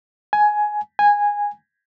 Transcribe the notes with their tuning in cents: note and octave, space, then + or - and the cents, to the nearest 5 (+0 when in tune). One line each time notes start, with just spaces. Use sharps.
G#5 +15
G#5 -10